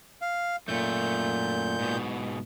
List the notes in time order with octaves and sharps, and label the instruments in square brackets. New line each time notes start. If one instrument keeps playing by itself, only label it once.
[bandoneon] F5
[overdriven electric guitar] F#2 A3 [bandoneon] A#2 G6
[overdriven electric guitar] G#2 B2